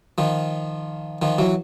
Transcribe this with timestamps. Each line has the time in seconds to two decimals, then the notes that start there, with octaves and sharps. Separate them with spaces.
0.18 D#3 F3
1.22 D#3 F3
1.39 E3 F#3